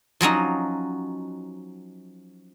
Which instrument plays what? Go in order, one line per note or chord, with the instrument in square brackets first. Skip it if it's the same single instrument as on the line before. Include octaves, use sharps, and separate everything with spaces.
[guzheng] F3 F#3 C#4 D#4